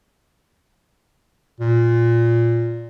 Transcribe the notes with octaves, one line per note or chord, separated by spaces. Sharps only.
A#2